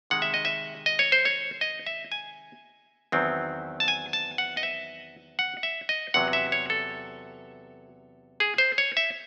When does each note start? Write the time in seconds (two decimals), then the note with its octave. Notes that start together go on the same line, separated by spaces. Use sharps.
0.10 C3 D#3 G#3 F#5
0.22 E5
0.34 D#5
0.45 E5
0.86 D#5
0.99 C#5
1.12 C5
1.25 C#5
1.61 D#5
1.86 E5
2.12 G#5
3.12 E2 D#3 F#3 C4
3.80 A5
3.88 G#5
4.13 A5
4.38 F#5
4.57 D#5
4.63 E5
5.39 F#5
5.63 E5
5.89 D#5
6.14 E2 C3 F#3 F#5
6.33 E5
6.52 C#5
6.70 A4
8.40 G#4
8.58 C5
8.78 C#5
8.97 E5